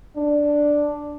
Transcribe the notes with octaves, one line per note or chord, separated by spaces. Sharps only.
D4